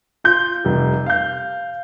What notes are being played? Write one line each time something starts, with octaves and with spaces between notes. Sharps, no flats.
F4 G6
F1 G3
F5 G6